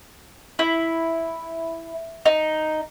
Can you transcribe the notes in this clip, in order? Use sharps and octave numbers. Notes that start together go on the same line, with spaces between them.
E4
D#4